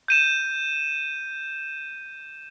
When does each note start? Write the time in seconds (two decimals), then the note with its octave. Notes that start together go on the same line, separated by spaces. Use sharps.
0.08 G6 D#7 E7